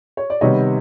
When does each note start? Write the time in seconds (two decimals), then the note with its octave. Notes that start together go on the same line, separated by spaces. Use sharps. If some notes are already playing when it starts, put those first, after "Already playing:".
0.17 C#5
0.30 D5
0.41 C3 D#3 G3 B3 C#5 D#5